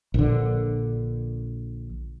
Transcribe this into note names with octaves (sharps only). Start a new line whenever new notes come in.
A#1 D3